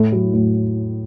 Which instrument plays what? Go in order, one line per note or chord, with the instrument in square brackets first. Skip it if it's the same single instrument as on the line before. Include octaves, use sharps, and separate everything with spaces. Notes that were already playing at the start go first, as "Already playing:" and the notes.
Already playing: [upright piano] A2 [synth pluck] A3
[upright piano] F#3
A2